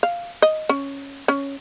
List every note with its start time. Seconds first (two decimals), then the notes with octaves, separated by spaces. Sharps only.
0.03 F5
0.42 D#5
0.69 C#4
1.28 C#4